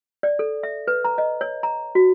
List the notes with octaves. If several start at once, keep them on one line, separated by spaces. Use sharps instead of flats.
D5
A4
E5
B4
A#5
D#5
C#5
A#5
F#4